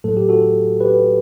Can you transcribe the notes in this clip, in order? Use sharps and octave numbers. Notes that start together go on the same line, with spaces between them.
A2 F#3 A3 A4
G4
F#4 A4
G4 B4